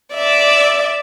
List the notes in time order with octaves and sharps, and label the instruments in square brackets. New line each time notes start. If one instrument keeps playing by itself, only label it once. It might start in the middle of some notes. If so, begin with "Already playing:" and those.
[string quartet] D5 E5